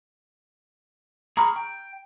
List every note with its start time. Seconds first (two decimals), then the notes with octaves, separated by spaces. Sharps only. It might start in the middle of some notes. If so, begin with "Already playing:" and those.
1.37 G#4 A#5 B5 C#6 F6
1.56 G5